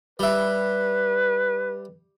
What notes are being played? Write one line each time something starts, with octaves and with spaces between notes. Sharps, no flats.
G3 B4 E5